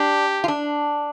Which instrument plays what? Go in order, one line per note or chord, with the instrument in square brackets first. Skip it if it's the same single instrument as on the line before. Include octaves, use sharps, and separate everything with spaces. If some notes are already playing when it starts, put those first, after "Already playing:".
Already playing: [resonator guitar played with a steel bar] D4 [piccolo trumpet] G4
[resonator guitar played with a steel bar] F4
D4